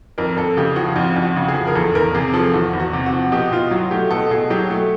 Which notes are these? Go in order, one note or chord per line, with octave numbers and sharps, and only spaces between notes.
F2 A#4
F2 A4
C#3 G4
F3 F#4
F2 F4
F2
F#4
C#3
G#4
F3
A#4
E2 A4
E2 A#4
C3 G#4
F3 A4
E2 F#4
E2
F#4
C3
F#4
F3
B2 G4
B2 F4
F#3 F#4
A3 G4
B2 A4
B2 G#4
F#3 G4
A3